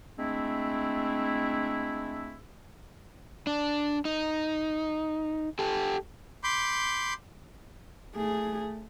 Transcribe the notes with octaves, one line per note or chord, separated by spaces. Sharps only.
G#3 A3 C4 D4 E4
D4
D#4
G4 A4
B5 C6 D6 G6
A3 G#4